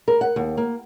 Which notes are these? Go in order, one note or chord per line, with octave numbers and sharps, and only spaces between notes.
A#4
F#5
D#2
A#3